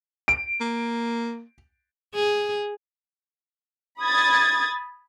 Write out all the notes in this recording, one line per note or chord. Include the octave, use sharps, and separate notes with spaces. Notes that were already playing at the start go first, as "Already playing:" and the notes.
D7
A#3
G#4
B5 D#6 G#6 A6